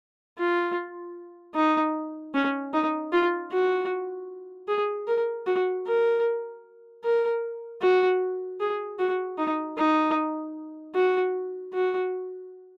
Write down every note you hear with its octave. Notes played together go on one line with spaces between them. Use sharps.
F4
D#4
C#4
D#4
F4
F#4
G#4
A#4
F#4
A#4
A#4
F#4
G#4
F#4
D#4
D#4
F#4
F#4